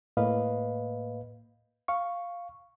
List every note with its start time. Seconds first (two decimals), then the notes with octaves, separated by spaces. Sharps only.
0.17 A2 A#3 B4 D#5 F5
1.88 F5 C#6